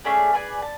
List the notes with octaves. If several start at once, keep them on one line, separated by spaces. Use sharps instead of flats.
A3 C#4 G#4 D5
G#4 B4 D5 G#5
A5